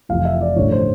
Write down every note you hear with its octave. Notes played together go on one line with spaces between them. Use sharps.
F1 F2 C3 E3 F5
E5
D5
A1 G2 D3 F3 C#5
C5